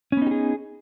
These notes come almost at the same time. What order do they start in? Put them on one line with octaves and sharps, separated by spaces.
C#4 B3 D#4 G4 G#4